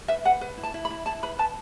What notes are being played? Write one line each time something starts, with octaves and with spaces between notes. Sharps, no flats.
B4 E5
B4 F#5
B4
E4
A5
E4
B5
E4
E4 A5
B4 B5
B4 A5